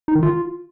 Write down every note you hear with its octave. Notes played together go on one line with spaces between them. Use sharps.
D#4
D#3
F4